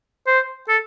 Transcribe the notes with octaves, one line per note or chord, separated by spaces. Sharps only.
C5
A4